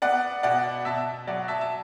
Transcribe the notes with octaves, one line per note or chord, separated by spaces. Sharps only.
B3 D5 F#5
B2 D5 F#5
B2 E5 A5
F#3 D5 F#5
E5 A5
A5